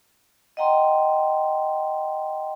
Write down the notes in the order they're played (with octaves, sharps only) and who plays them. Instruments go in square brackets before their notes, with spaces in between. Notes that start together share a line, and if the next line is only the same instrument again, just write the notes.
[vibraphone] D#5 F#5 G5 A#5 C6